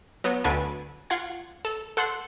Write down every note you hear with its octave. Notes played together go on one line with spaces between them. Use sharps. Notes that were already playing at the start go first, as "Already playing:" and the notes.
F#3 B3
D2 D3 B4 G#5 A5 D7
F4 F#5 G#6
A4
A4 F#5 C6